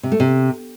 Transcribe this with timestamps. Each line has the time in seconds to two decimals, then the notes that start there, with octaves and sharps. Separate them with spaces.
0.03 C3
0.12 A3
0.20 C3